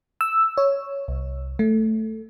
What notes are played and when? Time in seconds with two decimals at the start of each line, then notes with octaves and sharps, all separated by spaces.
0.21 E6
0.58 C#5
1.08 C2
1.59 A3